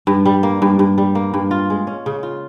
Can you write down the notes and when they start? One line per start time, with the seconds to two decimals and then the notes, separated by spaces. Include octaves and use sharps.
0.07 G2
0.26 G3
0.43 A#3
0.62 G2
0.79 G2
0.98 G3
1.15 A#3
1.34 G2
1.51 F4
1.70 G#3
1.87 C#4
2.06 C#3
2.23 F4